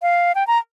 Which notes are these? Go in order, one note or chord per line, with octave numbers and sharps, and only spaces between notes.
F5
G5
A#5